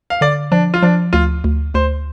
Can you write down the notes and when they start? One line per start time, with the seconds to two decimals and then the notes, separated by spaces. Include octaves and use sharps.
0.10 F5
0.21 D3 D5
0.52 F3 D4
0.74 F4
0.82 F3 D4
1.13 D2 F4
1.44 D2
1.74 D2 C5